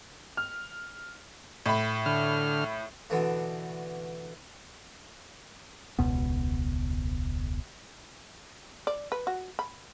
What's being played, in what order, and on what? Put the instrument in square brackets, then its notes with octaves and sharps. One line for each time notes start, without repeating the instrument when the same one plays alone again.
[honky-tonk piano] F6
A2 B5
[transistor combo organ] D3 F6
[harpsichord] B2 D3 E3 A3
[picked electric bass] E1 C#2 B2 B3
[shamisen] D5
B4
F#4
B5